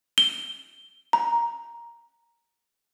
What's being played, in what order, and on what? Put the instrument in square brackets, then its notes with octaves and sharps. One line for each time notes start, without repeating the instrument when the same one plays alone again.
[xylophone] G7
A#5